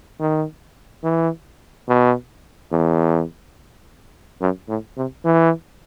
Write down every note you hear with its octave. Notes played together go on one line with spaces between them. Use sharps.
D#3
E3
B2
E2
F#2
A2
C3
E3